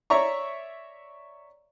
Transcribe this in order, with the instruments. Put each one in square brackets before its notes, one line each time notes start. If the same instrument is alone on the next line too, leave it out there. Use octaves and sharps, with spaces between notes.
[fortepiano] C#5 D5 E5 A#5 C#6